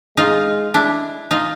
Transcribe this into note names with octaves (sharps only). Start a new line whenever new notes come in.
G#3 D#4 F4
D4 E4
D#4 F4